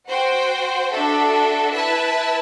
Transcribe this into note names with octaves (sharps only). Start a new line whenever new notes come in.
F#4 C5 G5
D4 F#4 A4 E5
E4 B4 E5 A5